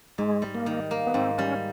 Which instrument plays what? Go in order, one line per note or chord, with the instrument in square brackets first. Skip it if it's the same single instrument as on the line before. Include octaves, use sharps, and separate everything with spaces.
[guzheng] G#2 [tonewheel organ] G#3
[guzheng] G3
[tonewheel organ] A#3
[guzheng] D#3
A#3
[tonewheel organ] B3
[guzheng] G#2 [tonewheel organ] C4
[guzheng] G3 [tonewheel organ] C#4